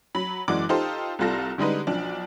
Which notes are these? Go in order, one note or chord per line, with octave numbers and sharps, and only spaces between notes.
F#3 B5
F#1 E3 G#3 F#4 D5 D6
D#4 F4 G4 A4 C5
C2 G3 F4 A4 A#6
D3 G3 G#3 D#4 B4
B1 F3 D4